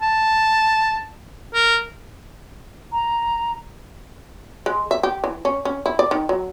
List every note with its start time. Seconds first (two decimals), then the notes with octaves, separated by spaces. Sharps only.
0.01 A5
1.54 A#4
2.92 A#5
4.66 G#3
4.91 E5
5.03 G4
5.24 E3
5.45 C#4
5.65 C#4
5.86 E4
5.99 D5
6.11 D#3
6.29 F#3